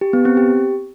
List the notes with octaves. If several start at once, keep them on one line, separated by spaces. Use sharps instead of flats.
G4
B3
C4
G4